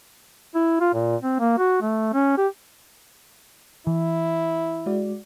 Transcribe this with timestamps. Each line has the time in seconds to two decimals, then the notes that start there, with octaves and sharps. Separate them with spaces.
0.55 E4
0.80 F4
0.94 A#2
1.22 C4
1.40 A#3
1.58 F#4
1.81 A3
2.13 C#4
2.38 G4
3.87 E3 E4
4.86 G#3 F#4 D5